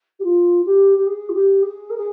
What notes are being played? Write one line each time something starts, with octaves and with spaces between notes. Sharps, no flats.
G4
F4
G4
G4
G#4
F4
G4
G#4
A#4
G#4